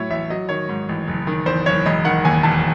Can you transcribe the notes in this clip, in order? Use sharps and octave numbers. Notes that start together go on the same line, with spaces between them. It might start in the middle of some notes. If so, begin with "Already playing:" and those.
Already playing: A2 F#3 A3 C#5 E5
A1 E5
F#3 D#5
D#3 C#5
G#2
A1
F#1
D#3
E2 C5
F#1 C#5
E1 D#5
D#3 F#5
D#2 G#5
E1 A5